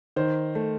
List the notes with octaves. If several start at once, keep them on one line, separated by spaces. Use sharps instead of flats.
D#3 C5
A3